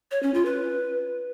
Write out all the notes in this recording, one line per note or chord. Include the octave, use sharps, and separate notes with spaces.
C#5
C#4
F4
B4